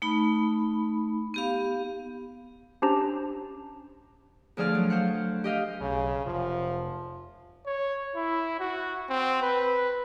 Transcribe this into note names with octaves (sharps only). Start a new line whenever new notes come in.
A3 D#4 B5
B3 G4 F5
C#4 D4 G4 C5 A5 A#5
D2 F3 G#4 D5 F6
F#3
C5 F5 F#5
G4 D#5 F5 G6
B1 C#3
F1 F3
C#5
E4
F#4
C4
B4